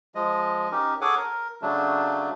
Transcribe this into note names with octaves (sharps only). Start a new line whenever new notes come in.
F3 G#3 D#5
C#4 D#4 G4 A#4
G#4 A4 C#5 F#5 G#5 D6
A#4
C#3 F#3 A3 D4